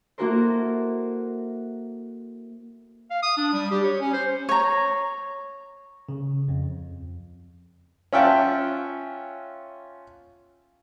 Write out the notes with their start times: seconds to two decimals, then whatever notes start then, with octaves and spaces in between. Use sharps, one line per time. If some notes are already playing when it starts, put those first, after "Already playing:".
0.18 A#3 E4 F#4 A4 A#4 C5
3.11 F5
3.23 D#6
3.37 D4
3.53 G3
3.71 G4
3.84 C#5
4.00 C#4
4.14 C5
4.49 C#5 A#5
6.09 C#3
6.48 F2
8.13 C#4 F4 E5 F#5 G5 A5